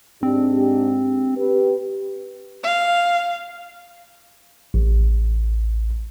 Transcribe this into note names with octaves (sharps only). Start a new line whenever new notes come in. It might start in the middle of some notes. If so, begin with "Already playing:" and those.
G#2 C4 D4 G4
G4 B4
F5
A1